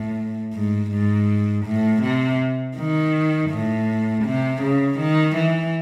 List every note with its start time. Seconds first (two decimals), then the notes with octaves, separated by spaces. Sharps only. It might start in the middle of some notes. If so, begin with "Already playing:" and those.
Already playing: A2
0.54 G#2
0.91 G#2
1.66 A2
2.02 C3
2.77 D#3
3.51 A2
4.25 C3
4.62 C#3
4.99 D#3
5.36 E3